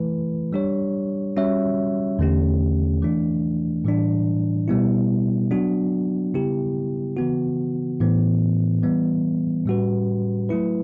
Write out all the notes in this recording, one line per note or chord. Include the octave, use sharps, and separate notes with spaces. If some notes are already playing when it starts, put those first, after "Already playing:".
Already playing: E3 A3 E4 B4
G3 D4 G4 C#5
G3 C#4 F#4 C#5 E5
E2 D3 A3 C#4 G4
E3 A3 D4
A2 E3 G3 D4
B2 G3 B3 E4
F#3 B3 D4 F#4
C#3 G3 B3 E4 G4
C#3 E3 B3 F#4
A2 E3 B3
E3 G3 B3
A2 G3 C#4 F#4 B4
F#3 A3 E4 B4